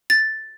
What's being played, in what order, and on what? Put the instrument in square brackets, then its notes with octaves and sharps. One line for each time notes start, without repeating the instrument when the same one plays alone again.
[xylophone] A6